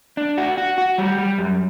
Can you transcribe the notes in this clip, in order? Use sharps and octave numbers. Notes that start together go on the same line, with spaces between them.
D4
F#4
F#4
F#4
G3
G3
F#2